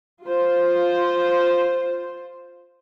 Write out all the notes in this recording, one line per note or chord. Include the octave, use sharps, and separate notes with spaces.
F4 C5